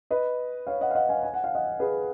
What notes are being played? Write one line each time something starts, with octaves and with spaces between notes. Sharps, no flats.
B4 D#5
C#5 F5
D#5 F#5
F5
D#5 F#5
F5 G#5
G#5
F#5
F5
D#5 F#5
G#4 B4